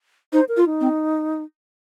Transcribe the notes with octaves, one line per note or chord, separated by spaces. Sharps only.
D#4 C5
A#4
F4
D#4
C4